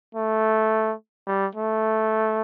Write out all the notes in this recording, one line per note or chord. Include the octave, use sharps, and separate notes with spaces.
A3
G3
A3